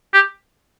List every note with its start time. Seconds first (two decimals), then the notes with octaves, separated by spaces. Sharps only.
0.14 G4